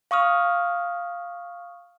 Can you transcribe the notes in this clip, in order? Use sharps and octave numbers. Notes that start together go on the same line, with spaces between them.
F5 C#6 D#6 F6